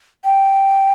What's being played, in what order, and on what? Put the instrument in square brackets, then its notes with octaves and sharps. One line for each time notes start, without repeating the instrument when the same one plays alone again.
[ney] G5